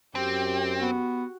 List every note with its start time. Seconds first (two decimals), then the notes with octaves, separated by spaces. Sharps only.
0.15 F#2 C4 G4
0.80 B3 F#4